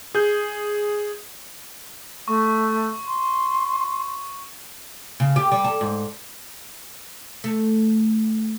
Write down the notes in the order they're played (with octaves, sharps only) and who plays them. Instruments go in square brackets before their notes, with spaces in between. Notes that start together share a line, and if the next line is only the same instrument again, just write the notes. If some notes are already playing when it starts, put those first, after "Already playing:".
[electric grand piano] G#4 G6
[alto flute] A3 [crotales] C#6
[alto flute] C6
[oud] C#3
G4
G3
A4
G#2
A3